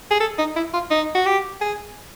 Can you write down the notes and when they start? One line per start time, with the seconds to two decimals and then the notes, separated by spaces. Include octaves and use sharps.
0.10 G#4
0.20 A4
0.38 D#4
0.56 E4
0.74 F4
0.91 D#4
1.15 F#4
1.26 G4
1.61 G#4